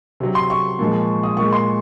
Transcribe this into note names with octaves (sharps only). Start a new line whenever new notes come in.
C3 F#3
C6
C#6
A#2 F3 G#3
D#6
A#2 G#3 C#6
C6